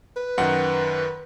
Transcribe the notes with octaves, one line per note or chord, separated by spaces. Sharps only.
B4
F#2 D#3 F#5